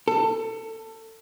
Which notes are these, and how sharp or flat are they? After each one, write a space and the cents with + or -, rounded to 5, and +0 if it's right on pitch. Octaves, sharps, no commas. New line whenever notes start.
A4 +25